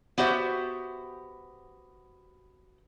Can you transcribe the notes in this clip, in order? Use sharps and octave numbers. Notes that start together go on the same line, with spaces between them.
B3 F#4 G4 C5 E5